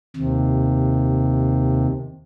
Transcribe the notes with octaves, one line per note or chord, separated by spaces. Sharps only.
D#2 C3